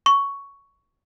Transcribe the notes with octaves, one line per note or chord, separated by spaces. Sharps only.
C#6